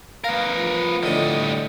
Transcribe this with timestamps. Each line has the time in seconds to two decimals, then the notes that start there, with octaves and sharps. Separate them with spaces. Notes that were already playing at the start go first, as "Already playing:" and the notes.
0.24 B3 A#4 F5
0.56 F3
1.03 A2 D3 G3 D#5